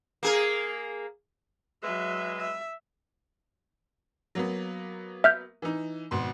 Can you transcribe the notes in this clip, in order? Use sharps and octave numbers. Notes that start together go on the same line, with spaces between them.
A#3 G#4 A#4
F#3 G#3 B4 E5
E5
F#3 A#3 B3
E5 F6 G6
E3 D#4
G#1 B2 C6